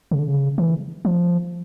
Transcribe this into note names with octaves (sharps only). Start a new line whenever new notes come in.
C#3
D3
C#3
E3
F3